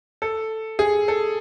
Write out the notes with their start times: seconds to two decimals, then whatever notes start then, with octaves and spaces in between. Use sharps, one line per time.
0.22 A4
0.79 G#4
1.08 A4